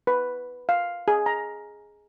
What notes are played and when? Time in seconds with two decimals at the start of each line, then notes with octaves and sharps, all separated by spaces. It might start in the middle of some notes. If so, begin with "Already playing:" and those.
0.07 B4
0.69 F5
1.08 G#4
1.26 A#5